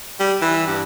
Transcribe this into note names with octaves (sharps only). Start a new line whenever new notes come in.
G3
E3
G2